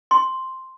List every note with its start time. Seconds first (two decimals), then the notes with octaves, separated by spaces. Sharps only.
0.11 C6